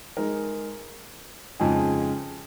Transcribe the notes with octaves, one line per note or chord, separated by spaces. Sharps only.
G#3 D#4 A#4
F2 C#3 G#3 D#4 G#4